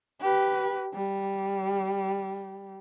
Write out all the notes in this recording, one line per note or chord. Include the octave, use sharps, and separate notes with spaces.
G4 B4
G3